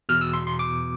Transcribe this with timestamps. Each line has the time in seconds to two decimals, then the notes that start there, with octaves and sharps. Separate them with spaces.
0.09 E2 B2 F6
0.21 E6
0.34 C6
0.47 C6
0.59 D6